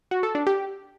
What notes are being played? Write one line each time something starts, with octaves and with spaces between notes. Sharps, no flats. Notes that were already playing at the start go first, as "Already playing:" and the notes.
F#4
A4
D4
G4